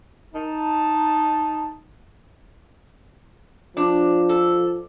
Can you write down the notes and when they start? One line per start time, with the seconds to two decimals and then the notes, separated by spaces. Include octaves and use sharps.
0.34 D#4 A5
3.77 F3 D4
4.29 A4